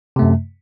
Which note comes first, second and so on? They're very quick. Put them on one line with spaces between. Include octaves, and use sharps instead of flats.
C3 A3 F#2